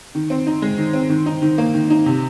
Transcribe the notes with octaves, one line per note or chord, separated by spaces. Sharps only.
D#3
C4
D#4
G#3
D#3
C4
D#3
D#4
D#3
A#3
D#3
D#4
C3